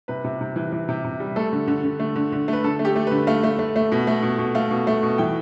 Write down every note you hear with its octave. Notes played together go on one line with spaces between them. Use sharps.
C3 B4
C3
C3
E3
E3
C3
C3
G3
A3 A4
D3
D3
D3
A3
D3
D3
A3 B4
D3 A4
A3
G4
A3
D3 B4
A3 F5
A3
A3
A3
B2
A3
B2
B2
A3 F5
B2
A3
B2
E3 G5